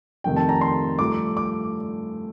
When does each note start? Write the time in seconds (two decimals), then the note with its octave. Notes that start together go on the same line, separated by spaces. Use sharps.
0.24 F2 C3 D#3 A3 G5
0.36 A5
0.49 A#5
0.61 C6
0.99 G2 F3 A3 D6
1.37 D6